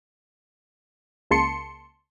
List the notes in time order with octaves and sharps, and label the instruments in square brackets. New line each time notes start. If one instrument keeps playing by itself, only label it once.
[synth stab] C#2 C#3 A#3 A5 C6 C#7